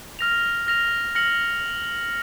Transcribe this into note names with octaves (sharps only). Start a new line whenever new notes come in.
F6 A#6 F7
F6 A#6 F7
F6 A#6 C#7 F#7